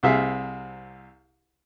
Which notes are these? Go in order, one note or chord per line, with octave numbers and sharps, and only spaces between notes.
C2 C3 G#4 E5 F5